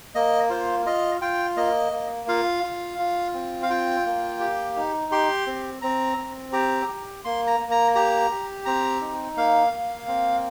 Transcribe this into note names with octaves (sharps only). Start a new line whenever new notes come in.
A#3 D#5
F4 C5
F4 D#5
F4 G5
A#3 D#5
A#3
F4 F5
F4
F4
C4
F5
F4 G5
A#3
G4
D#4
G4 C6
C4
C4 A#5
C4
G4 A#5
G4
A#3 C6
A#5
A#3
A#5
G4 A#5
G4
C4 A#5
D#4
A#3 F5
A#3
C4